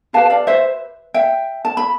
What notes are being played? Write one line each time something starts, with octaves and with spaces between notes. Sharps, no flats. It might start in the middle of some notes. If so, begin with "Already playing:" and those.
E4 G4 B4 F5 A5
D5 F5
C5 E5
E5 G5
A5
B5